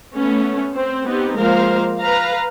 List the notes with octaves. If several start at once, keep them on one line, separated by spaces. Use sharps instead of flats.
A3 B3 C#4
C4 C5
B3 C4 D#4 G4
F3 G#3 A#3 A#4 C5 F5
B4 F5 A#5